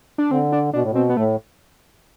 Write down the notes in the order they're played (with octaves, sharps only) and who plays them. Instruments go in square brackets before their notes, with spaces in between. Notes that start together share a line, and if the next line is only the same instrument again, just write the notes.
[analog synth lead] D4
[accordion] D3 [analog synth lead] C4
[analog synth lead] D4
[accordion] B2 [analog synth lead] D4
[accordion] A2
[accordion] B2 [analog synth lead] C4
[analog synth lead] B3
[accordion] A2 [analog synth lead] A3